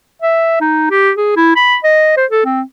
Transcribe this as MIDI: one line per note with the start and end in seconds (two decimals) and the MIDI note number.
0.22 0.57 76
0.60 0.89 63
0.90 1.11 67
1.16 1.34 68
1.36 1.56 64
1.56 1.77 83
1.84 2.12 75
2.17 2.26 72
2.30 2.43 69
2.45 2.62 60